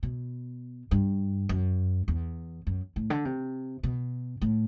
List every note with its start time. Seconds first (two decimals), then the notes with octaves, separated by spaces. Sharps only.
0.03 B2
0.91 G2
1.49 F#2
2.08 E2
2.67 F#2
2.96 A2
3.10 D3
3.25 C3
3.83 B2
4.42 A2